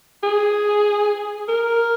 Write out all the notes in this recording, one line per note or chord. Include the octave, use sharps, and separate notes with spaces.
G#4
A#4